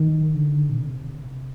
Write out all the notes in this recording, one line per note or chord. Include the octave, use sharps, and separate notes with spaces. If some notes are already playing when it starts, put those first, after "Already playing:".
Already playing: D#3
D3
A#2
C3